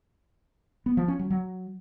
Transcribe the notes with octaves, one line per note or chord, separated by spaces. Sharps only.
B3
F3
C#4
F#3
F#3